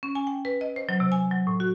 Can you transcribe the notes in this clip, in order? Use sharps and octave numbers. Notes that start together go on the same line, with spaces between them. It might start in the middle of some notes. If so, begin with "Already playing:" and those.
C#4
G#5
G5
B4
D#5
C5
F#3
C3
G#5
F#3
A2
F#4